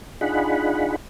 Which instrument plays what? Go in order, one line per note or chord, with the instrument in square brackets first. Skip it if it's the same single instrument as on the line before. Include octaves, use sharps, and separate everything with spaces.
[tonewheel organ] D4 D#4 F4 G#4 F#5 B5